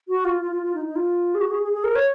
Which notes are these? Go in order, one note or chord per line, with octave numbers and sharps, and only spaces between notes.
F#4
F4
F4
F4
F4
D#4
D#4
F4
G#4
F#4
G#4
G#4
G#4
A#4
C#5